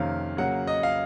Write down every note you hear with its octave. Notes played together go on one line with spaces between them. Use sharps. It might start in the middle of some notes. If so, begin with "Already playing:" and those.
Already playing: F2 C3 D#3 A#3 C#4 F5
C#3 F#3 A#3 F#5
D#5
F5